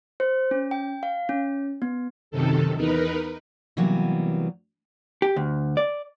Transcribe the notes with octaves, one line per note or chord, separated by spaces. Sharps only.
C5
C#4
G5
F5
C#4
B3
F#2 C3 D#3 A4
E2 D#4 A#4 B4
C3 E3 F#3 G3 A#3 B3
G4
D2
D5